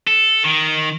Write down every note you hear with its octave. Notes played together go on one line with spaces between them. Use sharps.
A4
D#3